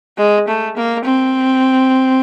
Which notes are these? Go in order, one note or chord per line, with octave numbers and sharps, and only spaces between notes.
G#3
A3
A#3
C4